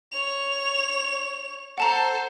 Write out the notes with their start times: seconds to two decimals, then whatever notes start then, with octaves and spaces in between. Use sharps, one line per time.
0.12 C#5 F7
1.78 A4 C5 F#5 A5 A#5